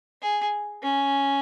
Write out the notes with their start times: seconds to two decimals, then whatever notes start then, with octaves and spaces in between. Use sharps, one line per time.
0.22 G#4
0.83 C#4